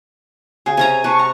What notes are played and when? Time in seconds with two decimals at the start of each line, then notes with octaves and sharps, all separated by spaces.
0.66 C#3 G#4
0.77 C3 C#4 G#5 A#5
1.04 C3 B4 A5 C#6
1.19 A#5